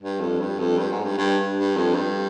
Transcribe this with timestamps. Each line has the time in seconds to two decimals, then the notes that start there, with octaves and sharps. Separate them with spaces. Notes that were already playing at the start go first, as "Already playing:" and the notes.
0.01 G2
0.21 F2
0.41 G2
0.59 F2
0.79 G2
0.92 G#2
1.04 G2
1.18 G2
1.57 G2
1.76 F2
1.95 G2